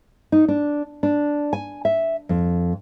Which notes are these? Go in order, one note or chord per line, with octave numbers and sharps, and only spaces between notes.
D#4
D4
D4
G#5
E5
F2